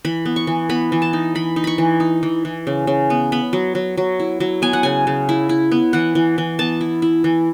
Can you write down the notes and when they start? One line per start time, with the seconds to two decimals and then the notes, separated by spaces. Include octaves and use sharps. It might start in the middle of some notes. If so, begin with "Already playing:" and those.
0.05 E3 B5
0.25 B3
0.36 C#6
0.47 E3
0.69 B3 B5
0.92 E3
1.02 A5
1.13 D#4
1.35 E3 B5
1.56 D#4
1.64 B5 C#6
1.78 E3
2.00 D#4
2.23 E3
2.45 E3
2.67 C#3
2.87 C#3
3.10 B3
3.32 B3 B5
3.53 F#3
3.75 F#3
3.97 F#3
4.20 E4
4.40 F#3
4.62 B3 G#5
4.73 F#5
4.83 C#3 G#5
5.07 C#3
5.29 E4
5.49 E4
5.71 B3
5.93 E3 F#5
6.15 E3
6.38 E3
6.59 B3 A5
6.81 E4
7.02 E4
7.24 E3